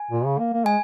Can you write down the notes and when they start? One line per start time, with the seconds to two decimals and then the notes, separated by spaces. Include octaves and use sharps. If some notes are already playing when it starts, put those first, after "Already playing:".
Already playing: G#5
0.11 A#2
0.25 C#3
0.38 A#3
0.53 A#3
0.65 G#3 G#5